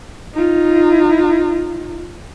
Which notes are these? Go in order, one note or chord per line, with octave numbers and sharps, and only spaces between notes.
D#4 F4